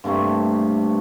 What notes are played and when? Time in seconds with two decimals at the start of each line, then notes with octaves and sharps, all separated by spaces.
0.04 G2 C3 A3 A#3